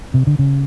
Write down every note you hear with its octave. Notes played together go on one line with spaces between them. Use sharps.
C3
D3
C#3